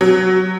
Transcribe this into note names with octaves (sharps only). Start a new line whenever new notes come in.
F#3